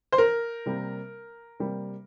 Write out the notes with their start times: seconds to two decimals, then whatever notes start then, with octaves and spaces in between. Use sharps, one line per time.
0.12 C5
0.18 A#4
0.66 C3 G3 A#3
1.60 C3 G3 A#3